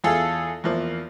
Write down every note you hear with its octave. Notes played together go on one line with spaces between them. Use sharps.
E2 F4 G#4 A4 E6
E2 F3 A#3